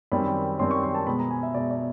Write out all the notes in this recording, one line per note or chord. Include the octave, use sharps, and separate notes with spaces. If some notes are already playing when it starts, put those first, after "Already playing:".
F#2 D#3 G3 C4 B5
F#2 D#3 G3 C4 C6
C#6
C6
A5
B2 G#3 B3 B5
A#5
G#5
E5
B2 G#3 B3 D5
D5